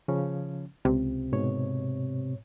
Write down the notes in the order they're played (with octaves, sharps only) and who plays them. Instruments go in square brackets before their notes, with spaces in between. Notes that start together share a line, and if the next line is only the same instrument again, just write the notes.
[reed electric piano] C#3 F3 C#4
[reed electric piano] C#2 [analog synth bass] C3
[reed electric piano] G#2 B2 C#5